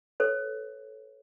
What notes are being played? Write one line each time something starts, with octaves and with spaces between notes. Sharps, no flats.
A4 B4 C#5